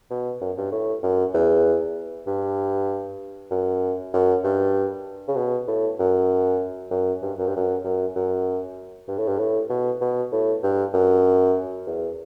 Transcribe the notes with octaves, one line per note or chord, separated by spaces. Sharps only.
B2
F#2
G2
A2
F#2
E2
G2
F#2
F#2
G2
C#3
B2
A2
F#2
F#2
G2
F#2
G2
F#2
F#2
F#2
G2
A2
G2
A2
B2
B2
A2
G2
F#2
E2